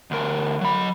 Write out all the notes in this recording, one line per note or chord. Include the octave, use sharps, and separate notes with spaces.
D2 A#4
F#3 B5